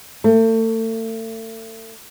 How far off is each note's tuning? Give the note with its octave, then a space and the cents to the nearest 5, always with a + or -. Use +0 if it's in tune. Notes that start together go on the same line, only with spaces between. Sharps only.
A3 +35